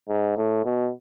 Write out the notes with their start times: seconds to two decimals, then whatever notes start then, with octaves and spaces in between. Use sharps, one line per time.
0.09 G#2
0.37 A2
0.65 B2